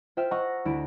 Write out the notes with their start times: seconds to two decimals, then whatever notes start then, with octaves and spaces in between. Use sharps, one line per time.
0.17 F4 C5 E5 G5 F6 E7
0.31 D#5 F#5 A#5 C#6 E6
0.65 D2 E4 D7